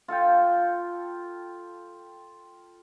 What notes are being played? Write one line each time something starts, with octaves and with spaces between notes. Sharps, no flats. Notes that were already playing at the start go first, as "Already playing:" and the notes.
F4 A4 F5 G5